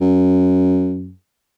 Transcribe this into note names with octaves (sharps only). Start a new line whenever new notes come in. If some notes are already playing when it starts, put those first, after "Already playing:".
F#2